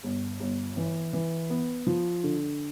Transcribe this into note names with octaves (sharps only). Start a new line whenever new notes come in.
G1
G1
E3
E3
B3
F3
D3